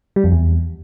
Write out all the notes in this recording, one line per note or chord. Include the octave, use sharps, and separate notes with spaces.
G3
F2
E2